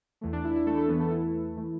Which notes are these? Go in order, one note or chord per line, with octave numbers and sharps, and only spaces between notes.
E2 E3 A3
D4
E4
E4
A3 A4
A3 A4
E2 E3 A3 B3 B4
A3 A4
E4
E3 A3